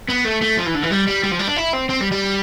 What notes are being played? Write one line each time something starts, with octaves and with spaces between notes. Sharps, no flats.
B3
A3
A3
F3
E3
D3
E3
G3
G3
G3
F3
G3
D4
E4
C4
C4
G3
G3